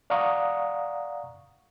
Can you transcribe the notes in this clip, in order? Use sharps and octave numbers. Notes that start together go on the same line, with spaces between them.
D5 F5 F#5 A#5 C#6 D#6